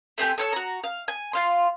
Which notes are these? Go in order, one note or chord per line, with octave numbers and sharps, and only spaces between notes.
A3 C4 G4 G#5
A4 C#5 E6
F#4 A#5
F5
G#5
F4 F5 C6